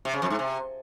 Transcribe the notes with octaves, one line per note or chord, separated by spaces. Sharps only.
C3
C#3
F2
G#2
C3